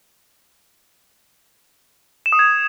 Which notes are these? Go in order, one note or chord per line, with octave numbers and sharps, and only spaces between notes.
E7
D#6
G#6